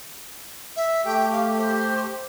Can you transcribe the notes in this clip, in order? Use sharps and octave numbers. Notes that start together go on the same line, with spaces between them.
E5
A3 G4 G5
F5
C5